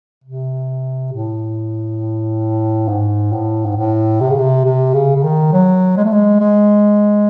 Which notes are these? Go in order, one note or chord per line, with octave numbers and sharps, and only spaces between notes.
C3
A2
G#2
A2
G#2
A2
C3
C#3
C3
C3
C#3
C#3
D#3
F#3
G#3
A3
G#3
G#3